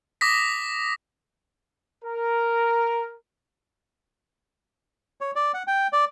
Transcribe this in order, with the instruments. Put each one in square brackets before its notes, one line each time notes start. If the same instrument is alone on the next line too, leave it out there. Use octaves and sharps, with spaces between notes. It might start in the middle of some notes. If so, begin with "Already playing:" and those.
[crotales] D6 D#6 A#6 B6
[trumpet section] A#4
[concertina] C#5
D5
F#5
G5
D5